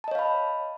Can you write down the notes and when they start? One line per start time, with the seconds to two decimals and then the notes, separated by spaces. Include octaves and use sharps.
0.04 A5
0.08 D#5
0.11 C#5
0.15 F5
0.19 B5